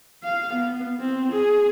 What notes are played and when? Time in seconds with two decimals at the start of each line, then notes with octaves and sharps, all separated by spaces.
0.24 F5
0.53 B3
1.00 C4
1.32 G#4